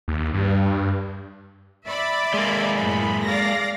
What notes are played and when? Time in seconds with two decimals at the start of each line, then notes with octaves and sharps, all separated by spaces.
0.08 D#2
0.34 G2
1.84 D5 E5 B5
2.34 G#3 A#3
2.78 F#2 A2 B5
3.24 D5 F5 A#6